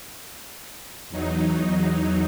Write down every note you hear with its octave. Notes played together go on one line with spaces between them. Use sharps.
E2 F#3 D#4